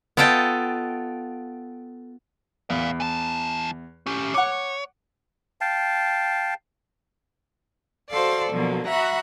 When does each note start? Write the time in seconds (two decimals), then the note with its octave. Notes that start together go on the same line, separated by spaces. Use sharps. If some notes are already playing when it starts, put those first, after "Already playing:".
0.17 B3 F4 A4 D#5 G5
2.70 E2 D5 F5
3.00 E3 A5
4.06 C#4 G4
4.34 C#5 F#5 D6
5.61 F5 G5 A5
8.10 F#4 A4 C5 D5 F5
8.51 B2 D3 F3 F#3 A#3
8.88 F#4 E5 F#5 A#5 B5